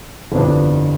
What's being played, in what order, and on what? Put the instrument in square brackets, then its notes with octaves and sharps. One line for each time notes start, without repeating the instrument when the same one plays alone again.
[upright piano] G1 F2 E3 B3 D4